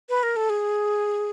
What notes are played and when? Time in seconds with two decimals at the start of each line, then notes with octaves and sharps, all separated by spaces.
0.09 B4
0.23 A#4
0.36 A4
0.50 G#4